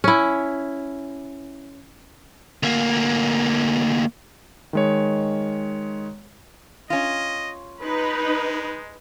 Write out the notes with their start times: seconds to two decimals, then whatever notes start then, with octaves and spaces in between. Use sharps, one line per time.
0.04 C#4 E4
2.63 D2 A#3
4.73 D#3 G#3 C#5
6.90 C#4 F4 D#5
7.82 G#3 D#4 B4